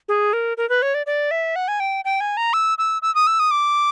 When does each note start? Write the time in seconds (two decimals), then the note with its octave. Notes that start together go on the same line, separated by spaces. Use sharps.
0.09 G#4
0.33 A#4
0.57 A#4
0.69 B4
0.82 C#5
0.94 D5
1.06 D5
1.31 E5
1.56 F#5
1.68 G#5
1.80 G5
2.05 G5
2.21 G#5
2.37 A#5
2.53 E6
2.78 E6
3.02 E6
3.15 D#6
3.27 E6
3.40 D#6
3.51 D6